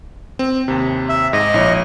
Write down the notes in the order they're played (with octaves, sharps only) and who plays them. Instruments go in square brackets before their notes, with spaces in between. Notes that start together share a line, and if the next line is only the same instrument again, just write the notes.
[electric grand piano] C4
D#2 C3
[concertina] E5
[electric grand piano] G#2 [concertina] D#5
[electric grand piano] A#1 E4 C#5